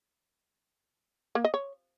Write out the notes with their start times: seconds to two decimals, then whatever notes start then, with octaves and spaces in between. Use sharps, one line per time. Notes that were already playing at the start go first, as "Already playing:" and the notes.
1.35 A#3
1.44 D#5
1.54 C#5